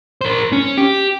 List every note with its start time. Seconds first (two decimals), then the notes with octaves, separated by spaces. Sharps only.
0.21 A#4 C5
0.52 C#4
0.77 G4